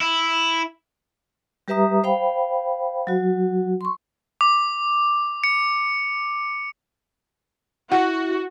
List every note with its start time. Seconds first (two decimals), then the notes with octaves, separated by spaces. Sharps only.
0.01 E4
1.68 G3 G4 B4 E5 A#5 D#6
2.04 C5 F5 G5 B5
3.07 F#3 F#4
3.81 C6 C#6
4.41 D6
5.44 C#7
7.92 E4 F#4 F#5